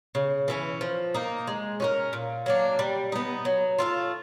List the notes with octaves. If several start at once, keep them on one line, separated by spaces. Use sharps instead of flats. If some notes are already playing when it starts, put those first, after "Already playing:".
C#3
E3 A3 C#4
F3
A#3 D#4
G#3
C#4 F#4 A#4
A#2
F#3 A#3 D4
G3
B3 D#4
F#3
A3 C4 F4